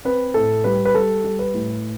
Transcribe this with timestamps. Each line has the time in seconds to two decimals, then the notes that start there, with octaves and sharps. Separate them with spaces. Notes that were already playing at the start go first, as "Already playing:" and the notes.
0.05 C4 B4
0.34 A2 A4
0.64 G3 B4
0.85 B4
0.95 G3 A4
1.24 G3
1.39 B4
1.54 A2